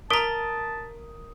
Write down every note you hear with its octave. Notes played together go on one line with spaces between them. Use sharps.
A#4 A5 A#5 D#6 B6 D7